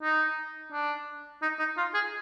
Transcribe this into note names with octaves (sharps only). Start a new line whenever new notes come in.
D#4
D4
D#4
D#4
F4
G#4